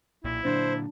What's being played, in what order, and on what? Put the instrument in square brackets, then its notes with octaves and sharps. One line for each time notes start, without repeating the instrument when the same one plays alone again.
[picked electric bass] B1 A#2 [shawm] E4
[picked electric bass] A#2 D3 [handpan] F#3 D4 [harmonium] C5